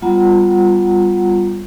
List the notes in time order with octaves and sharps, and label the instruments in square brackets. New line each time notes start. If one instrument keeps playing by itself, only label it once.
[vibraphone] G3 B3 F4 F#5 A#5